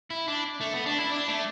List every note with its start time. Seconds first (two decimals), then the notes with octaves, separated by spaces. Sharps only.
0.10 E4
0.28 D4
0.61 A3
0.73 B3
0.86 D4
0.98 E4
1.11 D4
1.28 A3